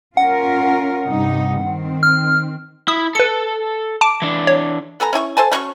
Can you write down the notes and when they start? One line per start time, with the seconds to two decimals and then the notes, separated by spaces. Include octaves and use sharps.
0.17 C#4 F4 A#4 F#5
1.06 G2 C3 D#4
1.61 D#3 C4
2.03 F6
2.88 E4 D#6
3.15 A4 B4 A5 C#7
4.01 A5 D6 D7
4.22 E3 D4
4.47 C#5
5.00 B3 A4 G#5 A#5
5.13 C#4 E4 G#5 C#6
5.37 A4 C5 G#5 A5
5.52 A3 C#4 F#4 C#6